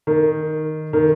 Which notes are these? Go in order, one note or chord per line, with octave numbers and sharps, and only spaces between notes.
D#3
D#3